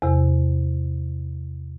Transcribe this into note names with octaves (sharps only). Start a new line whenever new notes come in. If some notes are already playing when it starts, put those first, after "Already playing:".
E2 C3